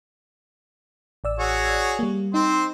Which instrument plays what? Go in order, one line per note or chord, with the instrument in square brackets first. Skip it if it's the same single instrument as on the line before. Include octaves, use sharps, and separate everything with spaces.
[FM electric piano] A1 D5 E6
[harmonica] F#4 G#4 C#5
[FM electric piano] G3 A#3
[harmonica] C4 C5 C6 [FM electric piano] D#4